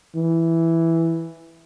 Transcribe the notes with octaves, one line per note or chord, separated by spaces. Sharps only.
E3